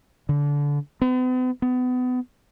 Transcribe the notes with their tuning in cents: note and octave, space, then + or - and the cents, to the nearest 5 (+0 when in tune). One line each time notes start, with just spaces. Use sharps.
D3 -25
B3 +45
B3 +30